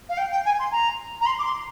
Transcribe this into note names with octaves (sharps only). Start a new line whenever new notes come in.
F5
G5
G5
G#5
C6
A#5
A#5
C6
D6
C6